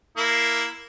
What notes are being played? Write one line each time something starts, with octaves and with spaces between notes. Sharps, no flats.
A#3 E4